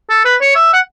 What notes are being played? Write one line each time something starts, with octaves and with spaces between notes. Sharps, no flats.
A4
B4
C#5
E5
F#5